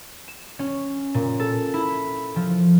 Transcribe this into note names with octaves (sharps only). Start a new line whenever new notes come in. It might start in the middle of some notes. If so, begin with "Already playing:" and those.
E7
C#4
A#2
A4
E4
F3